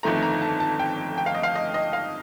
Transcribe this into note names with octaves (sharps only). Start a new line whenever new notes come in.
G1 F2 D#3 A3 A#5
A#5
A5
A5
G5
G5
F5
D#5
F5
D#5
D#5
F5